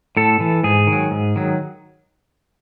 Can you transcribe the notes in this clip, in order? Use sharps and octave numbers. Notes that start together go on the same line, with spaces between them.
A2 A4
E3
G#2 G#4
D#3
F#3
G#2
D#3 F#3